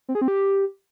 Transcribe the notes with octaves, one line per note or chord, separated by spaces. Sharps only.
C4
G#4
C4
G4